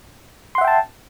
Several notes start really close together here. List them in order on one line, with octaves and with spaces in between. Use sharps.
C6 F#5 E5 G5 A5